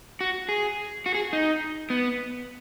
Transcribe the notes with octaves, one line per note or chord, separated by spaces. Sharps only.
F#4
G#4
F#4
G#4
D#4
B3